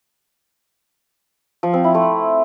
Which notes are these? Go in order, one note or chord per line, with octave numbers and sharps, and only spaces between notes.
F3
C4
E4
A3